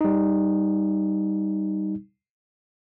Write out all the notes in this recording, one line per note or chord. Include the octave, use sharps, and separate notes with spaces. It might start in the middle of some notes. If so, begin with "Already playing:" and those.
G3 D#4